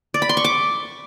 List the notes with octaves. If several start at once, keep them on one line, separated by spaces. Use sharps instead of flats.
D5
B5
C6
C#6
D6